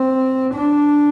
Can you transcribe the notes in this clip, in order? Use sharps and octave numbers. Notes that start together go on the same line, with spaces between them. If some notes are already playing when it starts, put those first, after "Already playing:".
Already playing: C4
D4